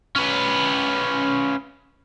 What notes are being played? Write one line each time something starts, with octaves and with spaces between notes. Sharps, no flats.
C#4 B4